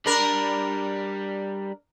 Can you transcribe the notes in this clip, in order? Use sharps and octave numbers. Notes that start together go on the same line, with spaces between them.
G3 D4 A#4 B5